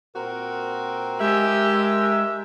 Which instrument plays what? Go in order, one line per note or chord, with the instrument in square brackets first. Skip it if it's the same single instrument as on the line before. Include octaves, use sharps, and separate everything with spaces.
[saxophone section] A#2 C4 F#4 [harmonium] A#4
[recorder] G#3 [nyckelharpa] G4 [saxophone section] E5